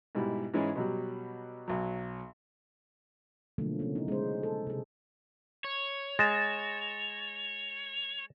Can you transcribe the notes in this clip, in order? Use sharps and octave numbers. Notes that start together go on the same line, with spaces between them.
G#2 B2 G3 E4
G#2 E3 G#3 C#4 E4
B2 F#3 G3
B1 F#3
B2 D3 F3 F#3 A3 A#3
C#3 A#3 C#4
D#4 E4
G#3 C#4 C5
A4
C3 G#4
C#5
G#3 A6 A#6 E7